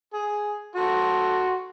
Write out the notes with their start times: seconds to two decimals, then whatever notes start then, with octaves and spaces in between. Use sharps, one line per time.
0.14 G#4
0.75 F#4 A4 C6